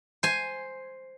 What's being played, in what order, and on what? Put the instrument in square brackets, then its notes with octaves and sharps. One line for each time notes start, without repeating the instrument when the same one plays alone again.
[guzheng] C5 G#5